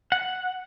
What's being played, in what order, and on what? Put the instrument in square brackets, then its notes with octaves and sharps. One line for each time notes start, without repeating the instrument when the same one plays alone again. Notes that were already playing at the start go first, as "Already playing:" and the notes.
[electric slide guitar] F#5